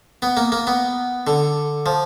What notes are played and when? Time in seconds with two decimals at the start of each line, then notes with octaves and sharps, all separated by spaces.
0.22 B3
0.37 A#3
0.52 A#3
0.67 B3
1.27 D3
1.86 F3